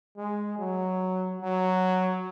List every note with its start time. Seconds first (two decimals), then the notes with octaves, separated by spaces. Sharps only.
0.16 G#3
0.58 F#3
1.41 F#3